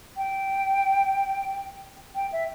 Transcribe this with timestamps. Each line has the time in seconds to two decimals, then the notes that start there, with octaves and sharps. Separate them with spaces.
0.17 G5
2.15 G5
2.32 E5